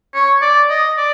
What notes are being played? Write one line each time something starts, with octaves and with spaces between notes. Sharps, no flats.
C#5
D5
D#5
D5